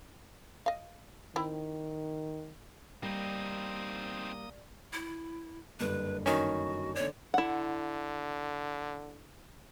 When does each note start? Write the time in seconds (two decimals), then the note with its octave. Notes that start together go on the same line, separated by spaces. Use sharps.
0.66 D#5 F5
1.36 D#3 C4 E4
3.03 G3 A#3 C4 D#4 D#6
4.93 E4
5.80 F#1 G2 D3 B4
6.26 D#3 C#4 F#4
6.95 D3 C#5 D5
7.34 D3 E4 F#5